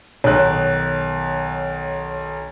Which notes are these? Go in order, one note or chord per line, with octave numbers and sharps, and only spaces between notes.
B1 D#3 C#5 F#6